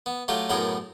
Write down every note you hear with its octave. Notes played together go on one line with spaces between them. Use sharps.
B3
F#3 A3 F4 G4
F#2 A2 B3 G#4 A#4 G5